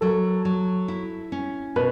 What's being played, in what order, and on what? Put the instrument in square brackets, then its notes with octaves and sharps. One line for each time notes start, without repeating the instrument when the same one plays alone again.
[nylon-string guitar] F#3 [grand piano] A4
[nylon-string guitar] F#3
E4
C#4
[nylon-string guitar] B2 [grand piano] B4